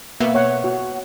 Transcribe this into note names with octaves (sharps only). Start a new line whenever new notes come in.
B2 A#3 B3 E5
C#5 F#5
F#4